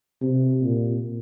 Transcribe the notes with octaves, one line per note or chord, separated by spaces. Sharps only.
C3
A#2